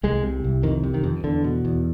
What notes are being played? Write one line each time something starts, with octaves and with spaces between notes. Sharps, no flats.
C2 G#3
C3
C2
F2 D#3
C3
D#3
F2
E2 D3
B2
E2